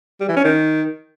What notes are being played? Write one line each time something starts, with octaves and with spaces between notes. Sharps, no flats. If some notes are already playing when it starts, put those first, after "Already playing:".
G3
E3
C#4
D#3